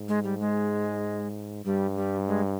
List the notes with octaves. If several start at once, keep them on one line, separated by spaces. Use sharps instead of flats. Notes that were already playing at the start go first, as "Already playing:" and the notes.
Already playing: G#2
G#3
G3
G#3
G2 G3
G3
G#3